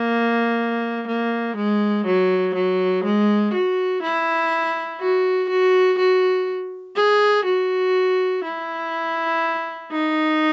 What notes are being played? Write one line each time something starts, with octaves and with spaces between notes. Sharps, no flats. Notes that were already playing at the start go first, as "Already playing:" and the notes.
Already playing: A#3
A#3
G#3
F#3
F#3
G#3
F#4
E4
F#4
F#4
F#4
G#4
F#4
E4
D#4